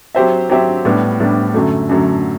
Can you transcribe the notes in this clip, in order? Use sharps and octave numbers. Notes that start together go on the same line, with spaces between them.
F#3 C4 G4 C5 E5
F#3 C4 G4 C5 E5
A2 G3 B3 D4
A2 G3 B3 D4
F#2 D3 F#3 A3
F#2 D3 F#3 A3